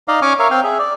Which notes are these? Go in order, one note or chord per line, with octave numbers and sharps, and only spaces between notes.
D#4 D5 D#5 F5
C#4 G#5 C#6 D6 F6
A#4 C#5 E5 F5
C4 F5 G5
G#4 E5
D5